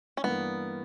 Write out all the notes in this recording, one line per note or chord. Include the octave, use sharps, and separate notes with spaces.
C#4
G2 E3 A#3 B3